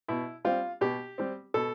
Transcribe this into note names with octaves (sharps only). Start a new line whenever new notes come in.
B2 E4
G3 C4 F4
B2 G4
G3 C4
B2 A4